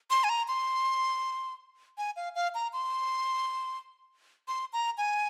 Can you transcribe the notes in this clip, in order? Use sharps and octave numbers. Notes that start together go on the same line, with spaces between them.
C6
G#5
A#5
C6
G#5
F5
F5
A#5
C6
C6
A#5
G#5